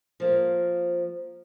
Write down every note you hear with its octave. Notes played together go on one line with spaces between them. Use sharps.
F3 A#3